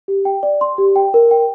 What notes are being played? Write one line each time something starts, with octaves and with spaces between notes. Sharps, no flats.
G4
G5
D5
C6
G4
G5
A#4
G5